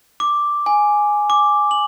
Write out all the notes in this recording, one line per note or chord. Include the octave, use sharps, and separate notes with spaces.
D6
G#5
D6
F#7